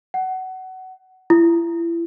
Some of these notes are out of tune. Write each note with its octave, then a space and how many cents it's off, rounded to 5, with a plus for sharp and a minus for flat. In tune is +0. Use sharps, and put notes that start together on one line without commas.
F#5 +20
E4 +35